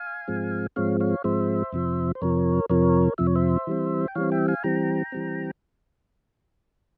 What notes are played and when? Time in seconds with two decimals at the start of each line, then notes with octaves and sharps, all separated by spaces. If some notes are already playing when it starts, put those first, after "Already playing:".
Already playing: F5 G#5
0.28 G#2 F3 G#3 C4
0.76 G#2 F3 G#3 C4 C#5 F5
1.00 C#5 F5
1.24 G#2 F3 G#3 C4 C5 E5
1.73 F2 C3 F3
2.15 C5
2.22 F2 C3 F3 A#4 C#5
2.70 F2 C3 F3 A#4 C#5
3.18 F2 C3 F3 E5
3.27 C#5
3.35 C5 E5
3.67 E3 G3 C4
4.08 G5
4.15 E3 G3 C4 C#5 F5
4.32 E5 G5
4.48 F5 G#5
4.64 E3 G3 C4 G5 A#5
5.12 E3 G3 C4